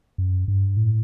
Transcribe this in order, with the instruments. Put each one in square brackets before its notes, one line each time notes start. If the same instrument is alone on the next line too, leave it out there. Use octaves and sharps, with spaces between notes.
[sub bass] F#2
G2
A2